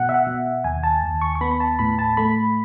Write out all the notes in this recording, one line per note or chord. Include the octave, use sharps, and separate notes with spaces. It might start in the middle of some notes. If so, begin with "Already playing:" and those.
Already playing: B2 F#5
E5
F#5
B2
D#2 G#5
A5
D#2
C#6
C#6
B3 B5
B5
A5
A2 B5
A5
A3 B5